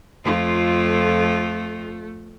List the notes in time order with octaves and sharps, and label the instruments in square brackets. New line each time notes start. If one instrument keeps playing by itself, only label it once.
[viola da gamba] F2 F4 [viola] A3